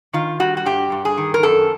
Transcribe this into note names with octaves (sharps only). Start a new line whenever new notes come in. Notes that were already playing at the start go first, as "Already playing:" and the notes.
D#3 F4
G3 F#4
F#4
G2 G4
G2
G#4
D#3
A#4
F#2 A4